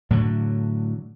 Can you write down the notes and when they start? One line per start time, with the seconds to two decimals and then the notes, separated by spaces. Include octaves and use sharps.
0.10 A2 D3 F#3